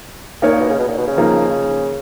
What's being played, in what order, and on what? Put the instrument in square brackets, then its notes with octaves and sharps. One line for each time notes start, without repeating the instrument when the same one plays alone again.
[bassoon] A#2 [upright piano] A#3 D#4 A#4 C#5
[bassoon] A#2
B2
C#3
B2
A#2
B2
C#3
[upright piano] F3 A#3 D#4